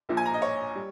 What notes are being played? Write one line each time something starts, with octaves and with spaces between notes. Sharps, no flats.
A#1 A#2 F3
G#5
A#5
D#5
C#5
G3